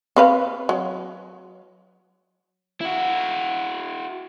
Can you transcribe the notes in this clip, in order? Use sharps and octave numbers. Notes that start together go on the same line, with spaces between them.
C4 B4 F5
F#3
E4 F#4